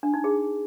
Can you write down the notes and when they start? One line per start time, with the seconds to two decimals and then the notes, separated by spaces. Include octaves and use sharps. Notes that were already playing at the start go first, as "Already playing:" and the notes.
0.03 D4
0.14 D#4
0.24 G#4